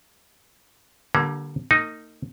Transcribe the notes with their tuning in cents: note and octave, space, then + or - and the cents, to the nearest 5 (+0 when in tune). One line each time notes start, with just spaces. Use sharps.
D3 +0 G3 -20 A#3 +25
A#3 -40 D#4 +0